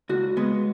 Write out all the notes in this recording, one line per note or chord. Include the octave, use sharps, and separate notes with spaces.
C#2 F#4
C#3 G#3 B3